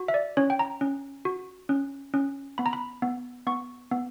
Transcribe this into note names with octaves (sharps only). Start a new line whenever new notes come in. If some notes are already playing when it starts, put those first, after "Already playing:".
Already playing: F#4
E5
D5
C#4 C#5
G5
A#5
C#4
F#4
C#4
C#4
B3 B5
A#5
B5
B3
B3 C#6
B3